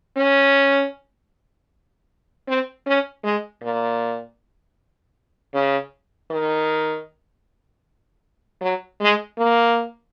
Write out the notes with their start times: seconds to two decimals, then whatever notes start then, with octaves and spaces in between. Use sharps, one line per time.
0.17 C#4
2.48 C4
2.86 C#4
3.24 G#3
3.62 A#2
5.54 C#3
6.31 D#3
8.61 F#3
9.01 G#3
9.38 A#3